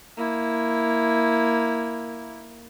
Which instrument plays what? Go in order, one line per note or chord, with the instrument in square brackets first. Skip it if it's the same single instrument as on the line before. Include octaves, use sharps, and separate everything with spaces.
[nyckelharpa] A#3 E4